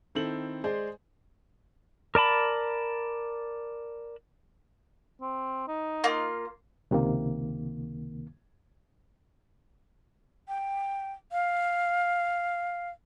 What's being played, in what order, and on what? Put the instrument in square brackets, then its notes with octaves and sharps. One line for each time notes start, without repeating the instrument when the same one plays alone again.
[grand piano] D#3 C4 E4 A4 F#7
G#3 G#4 C5 D5
[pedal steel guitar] A#4 D5 A5 B5
[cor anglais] C4
D#4
[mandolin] A#3 F4
[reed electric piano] C#2 C3 D#3 A#3
[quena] G5
F5